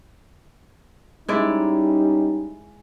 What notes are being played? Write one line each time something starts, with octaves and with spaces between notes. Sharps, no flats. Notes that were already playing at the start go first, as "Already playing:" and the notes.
G3 G#3 C#4 D#4 E4 D5